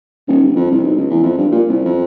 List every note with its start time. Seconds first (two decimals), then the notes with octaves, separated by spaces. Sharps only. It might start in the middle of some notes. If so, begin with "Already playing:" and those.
0.28 D#1
0.43 G1
0.55 F2
0.71 C2
0.84 B1
0.96 C#2
1.10 E2
1.23 F2
1.38 G2
1.52 A#2
1.69 C2
1.85 F2